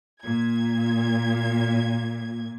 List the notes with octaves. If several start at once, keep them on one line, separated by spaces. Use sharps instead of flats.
A#2 G#6